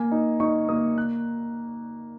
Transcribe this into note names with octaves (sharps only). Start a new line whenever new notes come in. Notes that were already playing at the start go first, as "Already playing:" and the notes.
Already playing: A#3 G#5
D#4
D#4 C#6
A#3 D#6
F#6